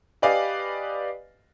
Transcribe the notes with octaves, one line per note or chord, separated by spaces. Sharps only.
G4 B4 D5 D#5 F5 G#5